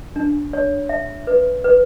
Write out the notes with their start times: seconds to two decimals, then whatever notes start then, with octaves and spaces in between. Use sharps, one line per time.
0.16 D4
0.53 C#5
0.89 E5
1.27 B4
1.64 B4